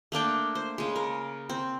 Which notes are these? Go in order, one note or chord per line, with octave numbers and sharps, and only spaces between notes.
A3 A#3 D4 G5
C5
C#3 G#3
A#4
C4